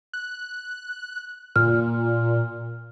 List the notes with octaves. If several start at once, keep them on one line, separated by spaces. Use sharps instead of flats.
F#6
A#2 F6